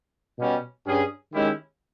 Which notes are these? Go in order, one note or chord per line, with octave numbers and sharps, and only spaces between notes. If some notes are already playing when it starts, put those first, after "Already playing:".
B2 G3 C#4
G2 G3 C#4 G#4
D#3 G#3 C#4 E4 G4